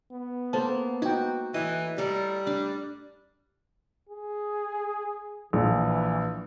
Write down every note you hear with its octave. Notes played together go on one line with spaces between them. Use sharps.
B3
A#3 A4 C5 A5
D#4 F#4 G5
A2 E3 D#5
G3 A4 A#4
D4
G#4
A#1 E3